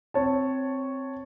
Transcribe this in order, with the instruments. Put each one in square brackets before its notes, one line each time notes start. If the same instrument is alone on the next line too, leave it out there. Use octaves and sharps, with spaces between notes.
[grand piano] C4 C#5 A5